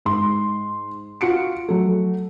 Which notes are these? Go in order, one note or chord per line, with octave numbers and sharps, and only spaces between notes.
G#2 C6
F4 F#4 C#7 D7
F#3 A3